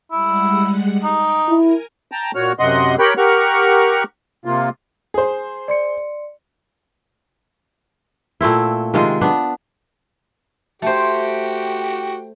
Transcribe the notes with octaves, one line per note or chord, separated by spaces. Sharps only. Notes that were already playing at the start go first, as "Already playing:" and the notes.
G3 G#3 E4 F#5
D#4 G5
E4 A#4 G#5
G5 A5 A#5
A#2 F#4 C#5 F6
F#2 C3 D#5 F#5 C6
G4 A#4 C#5 G5 B5 F#6
G4 A#4 F#5 C#6 F6
C3 A#3 F4
G#4 C5
D5 C6 C#7
A#2 A3 C4 E4
C3 D#3 G#3 F4
B3 D4
A3 F#4 G4 C5 G5